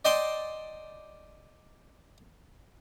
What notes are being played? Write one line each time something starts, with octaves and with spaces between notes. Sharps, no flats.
D5 D#5 G5 A5 C6 D6